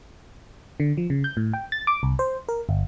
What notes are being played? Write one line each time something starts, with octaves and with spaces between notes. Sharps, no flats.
D3
F3
C#3
G6
A2
G5
A6
D6
C2
C5
A#4
G1